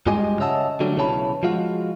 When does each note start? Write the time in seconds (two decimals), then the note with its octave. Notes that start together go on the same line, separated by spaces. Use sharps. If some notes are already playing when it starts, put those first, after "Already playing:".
0.06 G2 G#3 F4 G4 D#5 G#5
0.40 C#3 C#5 D#5 E5 F#5 A5
0.80 D3 F#3 G3 A3
0.96 B1 C#3 E3 C#5 A5 B5
1.43 F3 G#3 F4 F#4